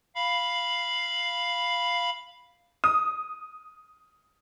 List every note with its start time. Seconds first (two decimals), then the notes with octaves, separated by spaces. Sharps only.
0.15 F5 B5
2.84 D#6